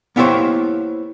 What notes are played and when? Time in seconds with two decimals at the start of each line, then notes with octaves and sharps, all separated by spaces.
0.16 A#3 B3 E4 G4 C5 C#5